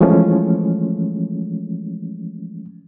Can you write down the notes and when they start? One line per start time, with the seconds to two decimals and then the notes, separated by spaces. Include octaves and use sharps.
0.01 E3 F3 G#3 A3 C#4